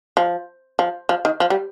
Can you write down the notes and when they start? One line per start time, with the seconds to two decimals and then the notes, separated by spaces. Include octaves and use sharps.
0.17 F3
0.79 F3
1.09 F3
1.25 D#3
1.40 F3
1.50 G3